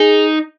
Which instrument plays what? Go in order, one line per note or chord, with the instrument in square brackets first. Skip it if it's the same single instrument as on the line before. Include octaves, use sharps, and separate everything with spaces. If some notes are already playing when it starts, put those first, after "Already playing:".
Already playing: [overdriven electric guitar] D#4 [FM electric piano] G#4